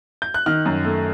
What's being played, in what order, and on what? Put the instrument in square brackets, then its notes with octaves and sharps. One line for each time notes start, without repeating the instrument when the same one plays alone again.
[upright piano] G6
F#6
D#3 F6
F#2
A3